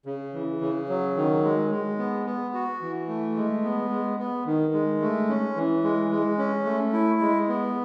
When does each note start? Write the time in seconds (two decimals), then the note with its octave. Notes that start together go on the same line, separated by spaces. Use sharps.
0.06 C#3
0.34 E3
0.61 C#3
0.89 F#3
1.17 D#3
1.44 G#3
1.71 G#3
1.98 B3
2.26 B3
2.54 F#4
2.81 E3
3.08 A3
3.36 G#3
3.64 B3
3.91 G#3
4.18 B3
4.46 D#3
4.73 G#3
5.01 A3
5.29 C#4
5.56 E3
5.83 G#3
6.11 G#3
6.38 C#4
6.65 A3
6.93 E4
7.21 G#3
7.48 B3